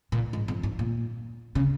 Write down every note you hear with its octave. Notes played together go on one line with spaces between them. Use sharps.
A#2
G#2
F2
G#2
A#2
C#3